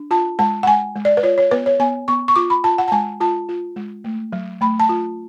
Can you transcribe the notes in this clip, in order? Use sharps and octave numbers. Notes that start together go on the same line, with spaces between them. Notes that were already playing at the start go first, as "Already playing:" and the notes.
Already playing: D4
F4 A5
G#3 A5
F#5
G#3 G#5
G#3
D5
B4
F4 C#5
C#5
B3 B4
C#5
B3 G#5
B3 C#6
C#6
F4 D6
B5
F4 A5
F#5
A5
G#3 G#5
F4 A5
F4
G#3
A3
F#3
A3 B5
A5
F4